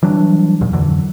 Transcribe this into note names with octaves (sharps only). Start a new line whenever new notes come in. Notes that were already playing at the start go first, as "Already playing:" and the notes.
E3 F#3 G3 D4
D#2 A#2
F2 D3 E3 F#3